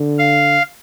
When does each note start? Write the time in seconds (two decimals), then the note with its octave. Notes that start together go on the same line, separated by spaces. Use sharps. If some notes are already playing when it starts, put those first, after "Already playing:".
Already playing: D3
0.19 F5